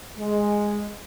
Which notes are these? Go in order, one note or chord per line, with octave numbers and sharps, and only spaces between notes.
G#3